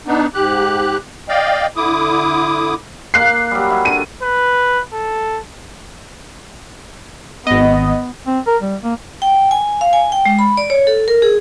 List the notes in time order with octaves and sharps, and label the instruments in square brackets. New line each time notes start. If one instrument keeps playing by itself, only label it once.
[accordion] B3 D4 D#4
G#2 G4 F#6
D5 D#5 F5 G5
D3 E4 D6 D#6
[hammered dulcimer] A#3 [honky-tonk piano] F#6 C7
[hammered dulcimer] F#3 G3
E4
[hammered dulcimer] D3 [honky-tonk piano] D#7
[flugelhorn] B4
A4
[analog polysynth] G#1 D#5 [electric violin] B3
[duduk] C4
A#4
G3
A#3
[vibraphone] G5
G#5
F5
G#5
G5
G#3
B5
D5
C#5
A4
A#4
G#4